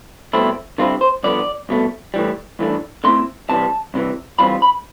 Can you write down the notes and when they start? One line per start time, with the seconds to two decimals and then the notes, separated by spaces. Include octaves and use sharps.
0.33 C2 B2 A3 C4 E4
0.78 D3 G3 C4 E4 F4
1.01 C5
1.23 G2 D3 F3 B3 D5
1.69 C2 B2 A3
2.14 A2 E3 G3
2.59 G2 E3 A3 D4
3.04 D3 A3 C4 E4 C6
3.49 C2 C3 E3 G3 A5
3.94 C2 C3 E3
4.39 G2 E3 G3 C4 F4 B5
4.62 B5